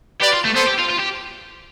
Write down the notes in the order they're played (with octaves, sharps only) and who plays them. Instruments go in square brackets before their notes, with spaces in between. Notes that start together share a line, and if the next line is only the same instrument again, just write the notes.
[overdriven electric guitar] G4 [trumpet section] B4 D5
[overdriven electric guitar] F4
A3
[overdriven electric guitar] B3 [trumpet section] A4 C5
[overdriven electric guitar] G4
F4
F4
G4